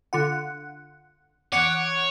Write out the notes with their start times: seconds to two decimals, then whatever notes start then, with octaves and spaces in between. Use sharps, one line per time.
0.13 D3 F4 F#5
1.52 E2 C#5 F#5 D6